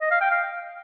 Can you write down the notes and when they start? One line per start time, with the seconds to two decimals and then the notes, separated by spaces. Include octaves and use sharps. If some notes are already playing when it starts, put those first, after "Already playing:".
0.01 D#5
0.11 F5
0.21 G5
0.31 F5